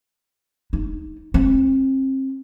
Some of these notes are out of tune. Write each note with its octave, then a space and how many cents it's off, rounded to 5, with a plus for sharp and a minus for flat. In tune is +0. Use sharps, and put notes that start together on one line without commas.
D#4 +0
C4 +30